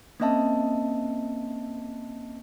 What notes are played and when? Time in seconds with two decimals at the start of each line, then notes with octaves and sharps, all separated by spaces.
0.20 A#3 C4 C#4 D#5 E5 A5